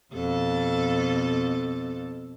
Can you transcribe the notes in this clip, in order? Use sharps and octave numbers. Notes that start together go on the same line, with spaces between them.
F2 B2 A4